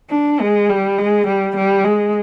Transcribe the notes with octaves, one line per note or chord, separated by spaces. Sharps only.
D4
G#3
G3
G#3
G3
G3
G#3